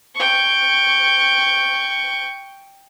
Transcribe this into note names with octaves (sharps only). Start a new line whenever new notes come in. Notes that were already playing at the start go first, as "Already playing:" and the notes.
G5 C#6